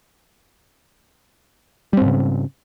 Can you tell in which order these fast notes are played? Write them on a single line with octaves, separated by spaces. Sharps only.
G3 C4 G#2 C#3